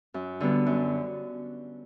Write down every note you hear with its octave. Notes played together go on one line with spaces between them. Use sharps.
F#2
D3 G3 B3
F#2